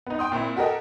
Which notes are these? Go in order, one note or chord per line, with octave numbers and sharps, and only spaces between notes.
B3 D#4
G5 C6 D#6
A#2 C4 E4
F#4 G4 A4 A#4 D#5